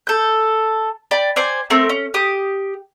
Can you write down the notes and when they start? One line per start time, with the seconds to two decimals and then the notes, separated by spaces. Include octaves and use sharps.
0.07 A4 G6
1.11 D5 G5 B5
1.36 C5 D5 G#5
1.70 A3 C4 A#4
1.89 C#4
2.14 G4 D#6